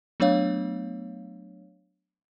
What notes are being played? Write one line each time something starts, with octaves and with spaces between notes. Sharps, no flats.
F#3 A3 B3 D4 C#5 F5